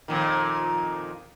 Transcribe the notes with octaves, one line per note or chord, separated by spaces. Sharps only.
F2 A#2 D#3